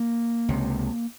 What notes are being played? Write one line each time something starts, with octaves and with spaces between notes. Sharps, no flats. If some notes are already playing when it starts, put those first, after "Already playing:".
Already playing: A#3
C#2 C3